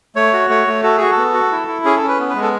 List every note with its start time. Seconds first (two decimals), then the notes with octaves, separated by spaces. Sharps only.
0.15 A3 C#5
0.33 F#4
0.49 A3 C#5
0.67 A3
0.83 F#4 A4
0.97 F#4 G#4
1.12 A4
1.17 B3
1.34 F#4
1.52 E4
1.68 E4
1.84 C#4 G#4
1.96 A4
2.03 C#4
2.08 B4
2.19 B3
2.30 B4
2.35 G#3
2.42 A4